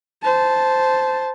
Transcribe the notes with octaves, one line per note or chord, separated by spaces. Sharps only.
C5 A5